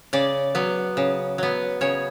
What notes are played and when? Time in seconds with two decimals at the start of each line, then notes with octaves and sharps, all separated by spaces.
0.13 C#3 D5
0.55 F#3 B3
0.97 C#3
1.38 F#3 B3
1.81 C#3 C#5